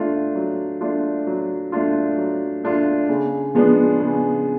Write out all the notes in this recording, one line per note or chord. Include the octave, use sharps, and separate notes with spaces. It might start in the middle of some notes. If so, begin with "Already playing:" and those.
Already playing: A3 D4 F4
F#3
A3 D4 F4
F#3
A3 D4 F4
F#3
A3 D4 F4
C#3
F3 G#3 B3 D4
C#3